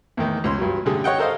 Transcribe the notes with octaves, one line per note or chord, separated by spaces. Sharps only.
E2 A2 D#3
C#2 C#4 C6
G2 F#3
A1 D3 G3 G#4 A4
C#5 D#5 F#5 G5
A4 A#4 C5 D#5 F5